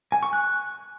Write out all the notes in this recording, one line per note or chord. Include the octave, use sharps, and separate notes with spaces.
G#5
C#6
F#6